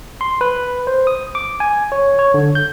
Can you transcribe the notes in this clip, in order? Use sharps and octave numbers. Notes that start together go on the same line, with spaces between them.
C6
B4
C5
D#6
D6
G#5
C#5
C#5
D3
G6